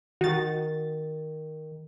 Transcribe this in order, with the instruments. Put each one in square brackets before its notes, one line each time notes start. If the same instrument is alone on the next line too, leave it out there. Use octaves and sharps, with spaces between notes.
[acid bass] D#3 [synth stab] F#4 A6